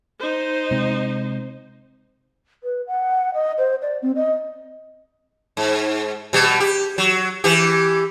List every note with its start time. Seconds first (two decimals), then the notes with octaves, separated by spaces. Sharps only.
0.19 D#4 C5
0.71 C3 G#3 C4
2.63 B4
2.87 F#5
3.34 D#5
3.58 C5
3.82 D5
4.02 C4
4.16 D#5
5.57 G#2
6.33 B2 G3
6.60 G4
6.98 F#3
7.44 E3 G4